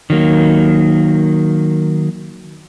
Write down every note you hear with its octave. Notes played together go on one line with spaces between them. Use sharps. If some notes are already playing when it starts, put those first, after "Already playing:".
D#3 F#3 A#3